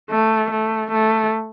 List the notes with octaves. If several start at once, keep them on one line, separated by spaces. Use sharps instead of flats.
A3
A3
A3